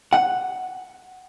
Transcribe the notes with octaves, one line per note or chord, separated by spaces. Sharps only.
F#5